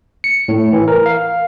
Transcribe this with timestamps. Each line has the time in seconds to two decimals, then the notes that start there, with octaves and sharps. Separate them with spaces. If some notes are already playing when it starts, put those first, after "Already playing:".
0.24 C#7
0.48 A2
0.73 E3
0.88 A#4
1.06 F5